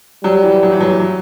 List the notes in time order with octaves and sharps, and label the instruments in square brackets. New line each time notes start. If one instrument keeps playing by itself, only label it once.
[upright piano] F#3 [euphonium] G3
[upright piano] E3
F#3
E3
F#3
F#3